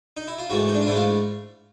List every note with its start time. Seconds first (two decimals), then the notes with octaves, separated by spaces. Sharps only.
0.17 D#4
0.27 E4
0.39 F4
0.50 G#2 E3 A3 F#4
0.68 D#4
0.75 D4
0.82 F4
0.86 G#2 E3 A3 E4
0.96 F4